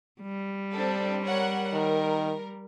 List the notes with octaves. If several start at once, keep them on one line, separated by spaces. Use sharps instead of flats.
G3
C4 D4 A4
A#4 C#5 F#5
D#3 A#4